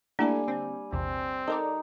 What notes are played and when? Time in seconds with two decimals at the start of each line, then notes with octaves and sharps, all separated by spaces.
0.19 G3 A3 A#3 D4 E4 A4 G#5
0.47 D3 C4
0.92 A#1 E2 C3 C4
1.47 D#4 A4 A#4 D5